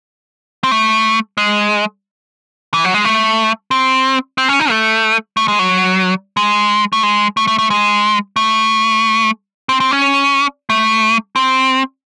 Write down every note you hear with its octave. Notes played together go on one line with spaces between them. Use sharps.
C4
A3
G#3
E3
F#3
G#3
A3
C4
C4
C#4
D#4
A3
A3
G#3
F#3
G#3
A3
G#3
A3
A3
A3
G#3
A3
C4
C4
C#4
A3
C4